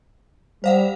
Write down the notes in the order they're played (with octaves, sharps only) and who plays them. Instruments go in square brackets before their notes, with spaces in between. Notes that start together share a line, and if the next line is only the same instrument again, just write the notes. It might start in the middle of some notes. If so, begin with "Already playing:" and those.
[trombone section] G3 [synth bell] C5 F5 F#5